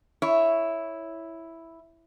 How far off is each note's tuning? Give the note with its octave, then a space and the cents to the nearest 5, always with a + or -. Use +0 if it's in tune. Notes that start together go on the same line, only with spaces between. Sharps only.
E4 +0 C#5 +0